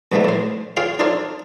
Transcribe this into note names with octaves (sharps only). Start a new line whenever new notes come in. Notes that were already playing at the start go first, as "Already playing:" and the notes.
A#1 G#2 E3 F3 G3 A3
A2 C5
F4 G#4 C#5 F5 G5
D4 D#4 F4 A4 C5 C#5